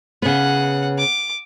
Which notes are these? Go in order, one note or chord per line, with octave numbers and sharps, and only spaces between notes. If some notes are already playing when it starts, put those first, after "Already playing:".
C#3 B3 F#5
D6